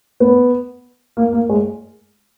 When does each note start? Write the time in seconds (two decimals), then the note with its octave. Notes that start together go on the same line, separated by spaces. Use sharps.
0.20 B3
1.17 A#3
1.33 A#3
1.49 G#3